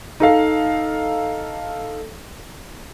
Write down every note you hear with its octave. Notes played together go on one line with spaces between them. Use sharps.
D#4 A4 F5